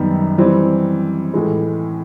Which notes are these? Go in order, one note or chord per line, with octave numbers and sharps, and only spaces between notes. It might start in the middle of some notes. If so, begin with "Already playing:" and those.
Already playing: F#2 D#3 G3 B3 D#4
E3 G3 C4
A2 E3 G#3